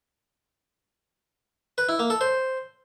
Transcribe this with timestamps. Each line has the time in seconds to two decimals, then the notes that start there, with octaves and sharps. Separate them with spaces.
1.78 B4
1.89 E4
1.99 A#3
2.10 A4
2.21 C5